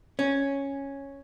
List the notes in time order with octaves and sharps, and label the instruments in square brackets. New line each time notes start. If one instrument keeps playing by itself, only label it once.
[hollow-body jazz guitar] C#4